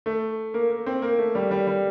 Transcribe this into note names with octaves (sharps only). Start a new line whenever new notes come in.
A3
A#3
A#3
C4
A#3
A3
G3
G3
G3